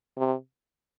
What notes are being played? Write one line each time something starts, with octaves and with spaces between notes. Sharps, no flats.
C3